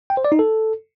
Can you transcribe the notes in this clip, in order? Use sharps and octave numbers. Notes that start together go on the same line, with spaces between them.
G5
C5
D5
D#4
A4